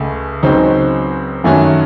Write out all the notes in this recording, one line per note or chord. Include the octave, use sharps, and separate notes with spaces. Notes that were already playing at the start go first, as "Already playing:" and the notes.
Already playing: C#2 C#3 A3
C#2 C#3 F#3 C4 D#4
F#2 D#3 A3 C#4 F#4